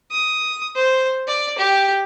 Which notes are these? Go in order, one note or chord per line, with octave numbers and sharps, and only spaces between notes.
D#6
C5
D5
G4